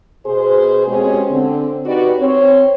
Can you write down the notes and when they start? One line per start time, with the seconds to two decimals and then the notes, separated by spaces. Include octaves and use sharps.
0.25 B2 G#4 C5
0.87 B2 G#3 C4 C#4 G4 G#4
1.31 D3 C4
1.86 D#4 F#4 G4 B4 D5
2.18 C4 C#5